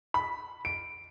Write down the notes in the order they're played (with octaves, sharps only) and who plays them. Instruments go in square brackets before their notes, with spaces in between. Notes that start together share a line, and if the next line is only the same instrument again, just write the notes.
[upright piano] B5
D7